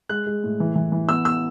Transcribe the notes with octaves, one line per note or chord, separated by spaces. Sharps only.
G#3 F#6
G#3
A2
E3
E3
E3
B3 E6
B3 E6